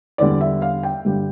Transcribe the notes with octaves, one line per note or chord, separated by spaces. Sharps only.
E2 D3 G3 D5
E5
F5
G5
G2 D3 G3